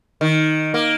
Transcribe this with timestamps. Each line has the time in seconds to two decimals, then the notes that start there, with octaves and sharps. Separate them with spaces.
0.21 D#3
0.74 A#3